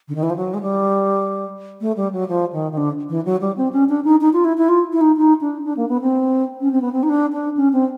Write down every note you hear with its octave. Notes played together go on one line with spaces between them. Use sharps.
D3
D#3
E3
F3
F#3
G#3
G3
A3
G3
F#3
F3
D#3
D#3
D3
E3
F#3
G3
C4
C#4
D4
D#4
D#4
F4
E4
E4
F4
E4
D#4
D#4
D4
D4
A#3
B3
C4
C#4
C4
B3
C4
D#4
D4
D4
C#4
C4